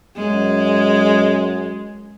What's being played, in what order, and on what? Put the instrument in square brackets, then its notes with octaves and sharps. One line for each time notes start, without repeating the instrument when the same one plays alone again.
[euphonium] F#2 [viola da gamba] G#3